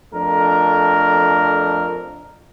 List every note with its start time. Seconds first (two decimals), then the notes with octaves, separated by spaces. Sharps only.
0.13 F2 A3 D4 A#4